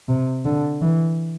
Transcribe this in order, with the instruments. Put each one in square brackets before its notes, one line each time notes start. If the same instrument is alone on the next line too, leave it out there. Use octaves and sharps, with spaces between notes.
[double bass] C3
D3
E3